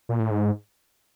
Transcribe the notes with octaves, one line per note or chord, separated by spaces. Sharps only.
A#2
A2
G#2